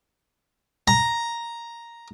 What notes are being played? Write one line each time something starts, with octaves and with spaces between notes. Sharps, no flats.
A#5